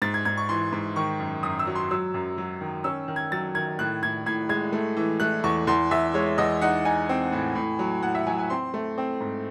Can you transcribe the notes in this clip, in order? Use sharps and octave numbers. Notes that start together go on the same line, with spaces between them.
G#2 A6
G#6
G#2 G#6
C#6
E3 C6
G#2
D#3 C#6
F#2
F#2 D#6
E6
F#3
C6
F#3 E6
F#2
F#3
D#3
C#4 E6
D#3
G#6
F#3 A6
D#3 G#6
A2 F#6
A2 G#6
A2 G#6
G#3 G#6
A3
E3
A3 F#6
E2 C#6
E2 C6
E2 E5
G#3 C#5
E2 D#5
D#4 F#5
D#4 G#5
C4
A2
A2
F#3
A2 F#5
E5
F#3 G#5
G#5
C4 C6
A3
C4
G#2